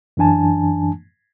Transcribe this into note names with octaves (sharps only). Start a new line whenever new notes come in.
F#2 E3 D4 G#5 A5